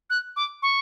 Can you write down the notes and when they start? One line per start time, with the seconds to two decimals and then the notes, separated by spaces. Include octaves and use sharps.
0.10 F#6
0.36 D6
0.62 C#6